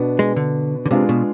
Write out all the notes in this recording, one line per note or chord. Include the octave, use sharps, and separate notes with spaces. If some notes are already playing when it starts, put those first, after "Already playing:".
Already playing: B2 B3 D4
G#3
D3
D3
C3 G#3 D4 F4 G#4 B4
B2